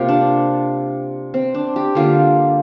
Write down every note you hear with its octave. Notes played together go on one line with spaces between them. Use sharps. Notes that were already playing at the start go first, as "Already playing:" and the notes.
Already playing: C3 A#3 F4 G4 A#4
D4
C4
D4
G4
D3 G3 A#3 F4